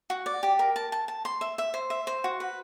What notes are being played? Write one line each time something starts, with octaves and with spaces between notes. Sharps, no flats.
F#4
D5
G4
A#4
A5
A5
A5
C6
E5
E5
C5
E5
C5
F#4
B4